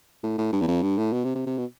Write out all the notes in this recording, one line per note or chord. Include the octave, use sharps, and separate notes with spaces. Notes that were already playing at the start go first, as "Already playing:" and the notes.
A2
A2
G2
E2
F2
G2
A2
B2
C3
C3
C3
B2